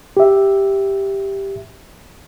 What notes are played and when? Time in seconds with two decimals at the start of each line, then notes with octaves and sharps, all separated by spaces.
0.17 G4 E5